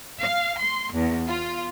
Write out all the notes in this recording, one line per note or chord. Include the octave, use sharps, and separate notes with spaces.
F5
C6
E2
F4